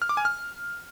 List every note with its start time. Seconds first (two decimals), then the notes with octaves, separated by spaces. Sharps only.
0.02 F6
0.09 D6
0.17 G#5
0.25 F6